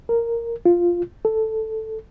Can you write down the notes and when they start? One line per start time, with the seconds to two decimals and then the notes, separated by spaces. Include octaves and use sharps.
0.09 A#4
0.66 F4
1.25 A4